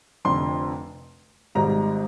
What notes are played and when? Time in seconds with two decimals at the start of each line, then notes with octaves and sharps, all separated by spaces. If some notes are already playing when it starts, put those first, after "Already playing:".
0.25 F1 F2 D3 C6
1.55 G#1 G#2 G3 A#5